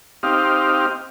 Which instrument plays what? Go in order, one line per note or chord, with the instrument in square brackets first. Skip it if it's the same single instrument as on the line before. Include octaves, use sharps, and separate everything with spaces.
[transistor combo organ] C4 D#4 G4 F5